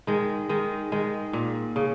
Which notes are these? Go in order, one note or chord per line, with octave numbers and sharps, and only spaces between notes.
D#3 G#3
D#3 G#3
D#3 G#3
A#2
C#3